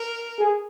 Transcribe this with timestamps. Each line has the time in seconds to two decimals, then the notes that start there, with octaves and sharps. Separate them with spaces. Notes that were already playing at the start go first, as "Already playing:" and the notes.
Already playing: A#4
0.39 G#4